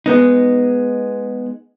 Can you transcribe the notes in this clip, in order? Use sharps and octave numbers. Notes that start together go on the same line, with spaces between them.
G#3 B3 D#4